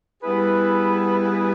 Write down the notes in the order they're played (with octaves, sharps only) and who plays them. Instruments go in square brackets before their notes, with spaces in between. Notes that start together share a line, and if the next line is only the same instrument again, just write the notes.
[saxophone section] G3 B3 E4 G#4 B4